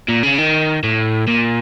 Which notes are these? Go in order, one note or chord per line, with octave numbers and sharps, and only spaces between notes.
A#2
C#3
D#3
A2
A#2